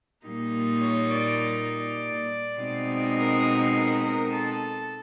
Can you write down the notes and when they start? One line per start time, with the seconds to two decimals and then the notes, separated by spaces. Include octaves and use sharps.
0.24 A#2 G3 A#3 D#4
0.82 C#5
1.11 D5
1.71 D5
2.58 B2 G#3 C4 D#4
3.16 A#4
3.74 A#4
4.03 A#4
4.32 A4